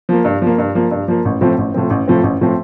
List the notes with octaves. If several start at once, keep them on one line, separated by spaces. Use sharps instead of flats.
F3 A#3
G2
F3 A#3
G2
F3 A#3
G2
F3 A#3
A1
A2 F3 C4
A1
A2 F3 C4
A1
A2 F3 C4
A1
A2 F3 C4